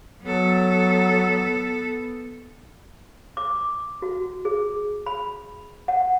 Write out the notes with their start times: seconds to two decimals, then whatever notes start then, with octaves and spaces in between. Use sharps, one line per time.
0.23 F#3 B3 A4
3.37 D6
4.02 F#4
4.45 G#4
5.06 B5
5.88 F#5